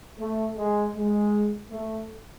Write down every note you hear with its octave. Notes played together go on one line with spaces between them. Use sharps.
A3
G#3
G#3
A3